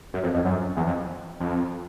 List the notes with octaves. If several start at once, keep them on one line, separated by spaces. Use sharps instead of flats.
F#2
F2
F2
F#2
E2
F2
F2